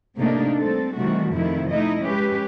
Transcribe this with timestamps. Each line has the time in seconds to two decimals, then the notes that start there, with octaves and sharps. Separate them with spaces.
0.16 A2 C3 A3 A#3 D4 D#4
0.58 G3 C4 A4
0.97 C3 D#3 E3 G3 A3 F#4
1.32 F2 C3 D#3 F3 A3 E4
1.71 A3 D#4 E4 D#5
2.02 G#3 C#4 G4 B4